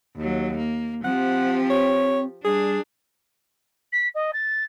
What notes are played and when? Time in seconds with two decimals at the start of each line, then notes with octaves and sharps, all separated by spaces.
0.16 D#2 F#3
0.57 A#3
1.04 F3 C4 G4 F#5
1.70 C#5
2.45 G3 D4 G#4
3.92 B6
4.14 D#5
4.33 A6